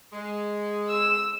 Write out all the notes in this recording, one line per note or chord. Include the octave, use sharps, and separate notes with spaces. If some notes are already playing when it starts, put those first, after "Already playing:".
G#3
E6